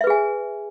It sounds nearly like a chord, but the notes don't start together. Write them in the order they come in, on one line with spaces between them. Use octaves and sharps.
E5 B4 G#4 G#5